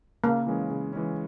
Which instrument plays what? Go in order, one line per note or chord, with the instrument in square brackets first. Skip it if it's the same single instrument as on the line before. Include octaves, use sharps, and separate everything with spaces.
[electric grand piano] C#3 [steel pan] A#3
[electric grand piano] E3 G#3 C#4
C#3
E3 G#3 C#4